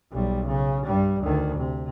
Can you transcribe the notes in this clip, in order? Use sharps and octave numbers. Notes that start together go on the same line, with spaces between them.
B1 G3
C#3
G2 G3
D2 D#3
C3